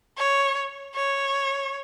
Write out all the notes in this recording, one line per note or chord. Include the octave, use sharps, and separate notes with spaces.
C#5
C#5